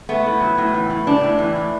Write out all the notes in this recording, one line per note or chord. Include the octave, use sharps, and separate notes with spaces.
A3 B3
A2
F#3
A2
E3
A2
G3 D4
A2
E3
A2